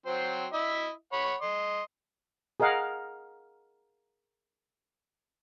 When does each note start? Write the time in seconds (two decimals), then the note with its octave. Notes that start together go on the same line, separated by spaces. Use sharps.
0.06 F#3 C4 C5
0.53 E4 D#5 E5
1.13 C#5 F#5 B5
1.42 D#5 C6
2.60 G#4 A#4 D#5 F5 F#5